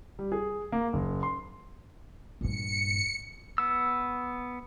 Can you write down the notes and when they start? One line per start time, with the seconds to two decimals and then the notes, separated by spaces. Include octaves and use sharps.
0.19 G3
0.32 G#4
0.72 A#3
0.93 F#1
1.23 C6
2.41 G2 A#2 C#7
3.58 B3 E6